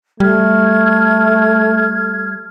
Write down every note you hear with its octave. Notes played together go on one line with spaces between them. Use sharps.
G3 A3 F6 G#6